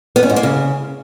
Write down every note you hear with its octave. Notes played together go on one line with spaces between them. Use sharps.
B3
C#4
G#2
A#3
C#3